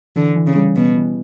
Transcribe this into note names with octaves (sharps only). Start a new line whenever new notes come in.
D3 E3
E3
C#3
G3
B2 E3
E3